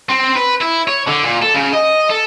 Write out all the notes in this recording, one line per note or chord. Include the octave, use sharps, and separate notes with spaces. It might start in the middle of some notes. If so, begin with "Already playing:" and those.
C4
B4
E4
C#5
D3
A#2
A4
C#3
D#5
A4